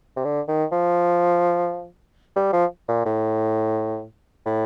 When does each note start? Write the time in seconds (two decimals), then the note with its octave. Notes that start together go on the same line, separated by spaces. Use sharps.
0.16 C3
0.25 D3
0.48 D#3
0.72 F3
2.36 G3
2.53 F3
2.89 A#2
3.06 A2
4.46 A2